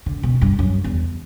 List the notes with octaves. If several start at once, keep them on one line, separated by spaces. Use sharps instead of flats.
D3
B2
G2
F#2
E2